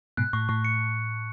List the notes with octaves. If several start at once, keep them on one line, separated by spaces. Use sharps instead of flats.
G#2 B2 F#6
A2 C#6
A2 C#6
C#7